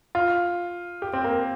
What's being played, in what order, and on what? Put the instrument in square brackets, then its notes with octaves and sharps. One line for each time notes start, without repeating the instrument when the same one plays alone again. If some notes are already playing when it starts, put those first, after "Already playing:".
[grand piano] F4
G4
C4
A#3